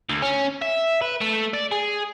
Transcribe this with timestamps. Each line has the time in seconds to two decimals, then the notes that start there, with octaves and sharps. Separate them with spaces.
0.10 D2
0.22 C#4
0.62 E5
1.02 B4
1.21 A3
1.54 D5
1.71 G#4